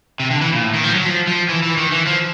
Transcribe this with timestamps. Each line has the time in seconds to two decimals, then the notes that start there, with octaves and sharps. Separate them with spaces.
0.20 C3
0.31 D3
0.41 E3
0.52 A#2
0.63 A2
0.74 D#3
0.84 F3
0.95 F#3
1.05 F3
1.27 F3
1.49 E3
1.63 E3
1.77 D#3
1.92 E3
2.07 F3